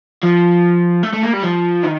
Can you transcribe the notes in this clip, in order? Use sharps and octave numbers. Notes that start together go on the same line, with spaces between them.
F3
A3
A3
A#3
G3
F3
D#3